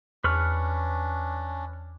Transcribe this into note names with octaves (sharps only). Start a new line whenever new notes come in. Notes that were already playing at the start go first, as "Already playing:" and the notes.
E2 C#4 D4 B4 C#6 F6